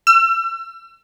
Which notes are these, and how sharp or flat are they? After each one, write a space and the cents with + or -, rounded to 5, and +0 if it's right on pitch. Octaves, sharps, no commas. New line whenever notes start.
E6 +35